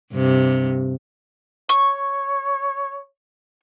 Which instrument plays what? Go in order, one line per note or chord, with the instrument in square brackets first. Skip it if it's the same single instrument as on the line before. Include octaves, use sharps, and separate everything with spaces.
[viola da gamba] G2 C3
[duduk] C#5 [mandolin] C#6